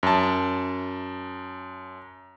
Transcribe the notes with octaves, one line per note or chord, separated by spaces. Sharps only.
F#2 A5